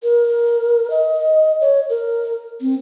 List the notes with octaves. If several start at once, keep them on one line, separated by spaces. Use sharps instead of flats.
A#4
D#5
C#5
A#4
C4